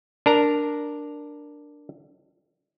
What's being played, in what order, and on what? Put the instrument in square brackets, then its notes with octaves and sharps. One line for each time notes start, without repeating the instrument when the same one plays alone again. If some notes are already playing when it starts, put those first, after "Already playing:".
[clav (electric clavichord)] D4 A#4 A#5